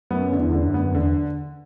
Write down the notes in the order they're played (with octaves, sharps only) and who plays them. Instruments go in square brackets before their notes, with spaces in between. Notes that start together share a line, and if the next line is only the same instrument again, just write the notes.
[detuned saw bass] F#2 [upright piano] B3
[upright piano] D3
[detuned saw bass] E2
[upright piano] D3
[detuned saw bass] F#2
[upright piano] B3
[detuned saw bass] E2 [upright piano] D3